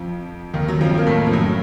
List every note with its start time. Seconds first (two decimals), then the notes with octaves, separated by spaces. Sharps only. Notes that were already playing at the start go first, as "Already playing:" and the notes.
Already playing: F2 F3
0.54 D#2 D#3
0.68 F#3
0.81 F2 F3
0.98 A#3
1.06 A2 A3
1.26 F3
1.33 F#2 F#3